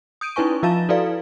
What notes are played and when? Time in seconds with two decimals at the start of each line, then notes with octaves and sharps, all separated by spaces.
0.21 D#6 G6 D7 D#7
0.36 C#4 D#4 E4 B4 G#5 C#6
0.63 F3 F4 F5 A5 A6 E7
0.89 E4 F#4 A4 B4 D5 F5